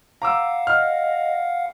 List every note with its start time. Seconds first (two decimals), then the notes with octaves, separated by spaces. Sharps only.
0.22 F5 F#5 A#5 D6 E6
0.67 D#5 F6